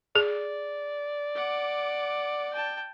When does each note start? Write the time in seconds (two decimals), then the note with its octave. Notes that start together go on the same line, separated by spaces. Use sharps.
0.16 G#4 D5
1.35 F#5 D6
2.53 G5 A5